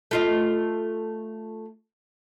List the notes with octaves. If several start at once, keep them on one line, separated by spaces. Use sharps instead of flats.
A3 F4 D#5